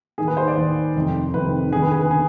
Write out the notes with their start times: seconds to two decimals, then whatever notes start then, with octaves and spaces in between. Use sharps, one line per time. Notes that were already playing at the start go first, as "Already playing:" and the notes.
0.18 D#2 D#3 G#4
0.28 B4
0.37 C5
0.48 D5
0.56 D#2 D#3 C5
0.96 F1 F2 C3 D#3
1.34 F1 F2 C3 D#3 B4
1.72 D#2 D3 G#4
1.82 B4
1.92 G#4
2.01 B4
2.11 D3 G#4